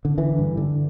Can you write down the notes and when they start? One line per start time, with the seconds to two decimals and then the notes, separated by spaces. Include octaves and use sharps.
0.05 D3
0.18 D3 E3
0.39 G2
0.57 D3